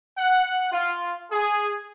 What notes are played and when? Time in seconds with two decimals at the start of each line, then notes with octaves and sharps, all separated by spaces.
0.18 F#5
0.72 F4
1.31 G#4